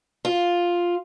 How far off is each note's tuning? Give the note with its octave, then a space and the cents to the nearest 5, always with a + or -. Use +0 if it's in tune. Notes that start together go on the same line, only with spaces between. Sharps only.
F4 +5